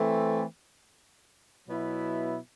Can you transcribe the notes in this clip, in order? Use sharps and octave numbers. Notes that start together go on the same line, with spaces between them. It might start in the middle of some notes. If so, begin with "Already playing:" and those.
Already playing: E3 A3 C4
B2 F#3 B3 E4